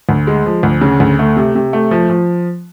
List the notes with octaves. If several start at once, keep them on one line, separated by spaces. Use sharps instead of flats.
D2
G#3
F3
D2
C#3
D2
A3
C3
C3
A3
F3
F3